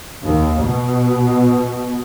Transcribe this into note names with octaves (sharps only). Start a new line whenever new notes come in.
D#2
B2